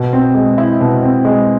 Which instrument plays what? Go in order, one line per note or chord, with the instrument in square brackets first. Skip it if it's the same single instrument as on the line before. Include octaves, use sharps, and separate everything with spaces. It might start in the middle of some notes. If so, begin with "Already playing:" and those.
Already playing: [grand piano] B2
C4
G#3
E4
B2
C4
G#3